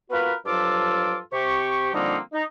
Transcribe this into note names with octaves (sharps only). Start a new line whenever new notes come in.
B3 F4 F#4 A#4 B4
G2 F3 F#3 F4 A4 D6
C3 G4 C#6
D3 F3 G3 A#3 C4 D#4
D#4